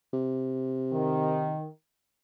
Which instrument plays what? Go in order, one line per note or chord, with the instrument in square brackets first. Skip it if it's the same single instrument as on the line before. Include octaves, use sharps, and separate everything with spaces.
[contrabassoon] C3
[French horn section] D#3